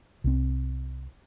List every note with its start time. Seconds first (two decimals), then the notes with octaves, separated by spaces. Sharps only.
0.24 C2 C4